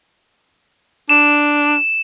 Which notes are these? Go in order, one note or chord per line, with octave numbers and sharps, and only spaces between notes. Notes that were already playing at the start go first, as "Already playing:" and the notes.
D4 E7